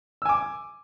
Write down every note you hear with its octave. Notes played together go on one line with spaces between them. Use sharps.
G#5 D6 E6